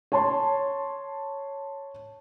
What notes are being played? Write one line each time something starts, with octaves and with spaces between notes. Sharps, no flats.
C#5 A5 C6